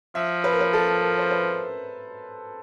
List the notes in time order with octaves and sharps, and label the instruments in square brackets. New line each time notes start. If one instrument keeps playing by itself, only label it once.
[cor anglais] F3 [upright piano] E5
[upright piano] B4
A#4
B4
A4
A#4
C5
B4